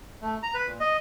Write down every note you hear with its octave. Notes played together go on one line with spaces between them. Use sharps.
A3
A#5
B4
A#2
D#5